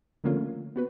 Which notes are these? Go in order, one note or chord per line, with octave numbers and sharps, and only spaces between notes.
D3 F3 A3 A#3 C#4 F4
B3 F#4 B4